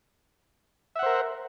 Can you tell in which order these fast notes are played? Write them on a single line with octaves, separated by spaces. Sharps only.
E5 F#5 C5 A#4